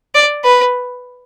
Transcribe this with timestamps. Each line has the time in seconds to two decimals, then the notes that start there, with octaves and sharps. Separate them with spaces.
0.15 D5
0.44 B4